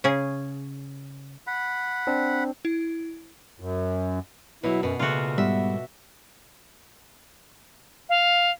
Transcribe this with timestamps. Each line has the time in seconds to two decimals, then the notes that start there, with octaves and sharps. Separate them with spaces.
0.04 C#3 C#4 G#4
1.47 F#5 B5
2.07 C4 D4
2.65 E4
3.60 F#2
4.64 B2 F#3 B3 E4
4.83 F#2 B2 B3
5.00 A#2 C#3 A3 F4 F#4
5.38 G#2 G3 B3 E5
8.09 F5